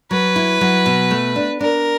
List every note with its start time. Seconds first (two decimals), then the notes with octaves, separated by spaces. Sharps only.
0.11 F#3 B4
0.36 E4
0.61 F#3
0.86 B2
1.11 A3
1.36 D4
1.61 D4 A#4